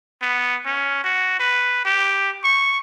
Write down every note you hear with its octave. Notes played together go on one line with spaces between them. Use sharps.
B3
C#4
F#4
B4
G4
C#6